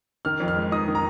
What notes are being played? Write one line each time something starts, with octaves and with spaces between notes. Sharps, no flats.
D#3 F6
F2
F6
G#3
D#4 D#6
D#3
A#5